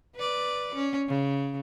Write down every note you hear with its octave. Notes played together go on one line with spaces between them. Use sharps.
B4 D5
C#4
C#3